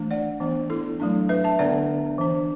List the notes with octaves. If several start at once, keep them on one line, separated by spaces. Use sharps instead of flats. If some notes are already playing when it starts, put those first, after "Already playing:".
Already playing: E3 A3 D4
D5 F#5
E3 B3 D4
E4 A4
F#3 A3 D4
B4 E5
E5 A5
D3 B3 D4 D5 F#5
E3 D4